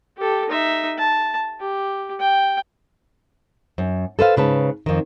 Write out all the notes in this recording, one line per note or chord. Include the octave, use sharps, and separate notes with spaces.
G4 A4
D#4 E5
A5
G4
G5
F#2
A4 B4 C5 F5
G#2 C#3 B4 A5
F2 D#3